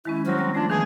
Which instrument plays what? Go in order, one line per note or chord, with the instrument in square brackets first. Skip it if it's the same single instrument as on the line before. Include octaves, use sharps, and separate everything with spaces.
[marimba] D#3 G#3 C#4 [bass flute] E4
[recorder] F#3 [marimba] G3 C6 F6 [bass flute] C5
[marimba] G3 [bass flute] C4
[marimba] F3 A3 [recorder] D4 [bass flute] F4
[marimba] D#3 E3 [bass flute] B3 [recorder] G#4